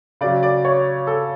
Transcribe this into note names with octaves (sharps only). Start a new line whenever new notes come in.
C#3 F#3 D5
D5
C#5
A4